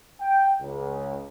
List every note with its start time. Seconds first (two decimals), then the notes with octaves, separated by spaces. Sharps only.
0.21 G5
0.62 C#2